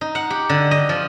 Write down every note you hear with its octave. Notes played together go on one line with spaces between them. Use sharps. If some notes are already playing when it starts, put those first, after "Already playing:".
D#4
F#5
G4
D3
D#5
F3